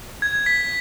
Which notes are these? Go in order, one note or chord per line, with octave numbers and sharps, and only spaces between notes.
G#6
B6